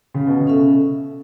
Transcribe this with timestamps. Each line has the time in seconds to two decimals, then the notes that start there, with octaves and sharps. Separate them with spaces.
0.14 C#3
0.27 B2
0.40 C#3
0.47 C#4 A4 E5